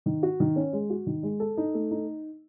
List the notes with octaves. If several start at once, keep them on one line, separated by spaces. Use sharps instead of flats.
D#3
F#4
D#3
C#4
G#3
F#4
D#3
G#3
A4
D#4
A3
D#4